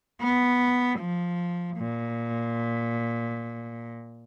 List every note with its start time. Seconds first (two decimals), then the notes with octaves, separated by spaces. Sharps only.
0.22 B3
1.00 F3
1.78 A#2